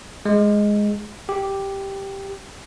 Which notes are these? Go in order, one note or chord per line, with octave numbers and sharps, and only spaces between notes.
G#3
G4